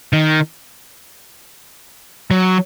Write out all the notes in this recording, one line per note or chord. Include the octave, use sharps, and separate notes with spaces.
D#3
F#3